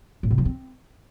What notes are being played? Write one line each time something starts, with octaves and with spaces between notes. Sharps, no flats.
A2
C3
F3
C4